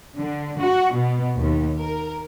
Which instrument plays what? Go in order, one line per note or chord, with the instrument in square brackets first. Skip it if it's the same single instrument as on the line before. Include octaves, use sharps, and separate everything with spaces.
[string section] D3
F#4
B2
D#2
A#4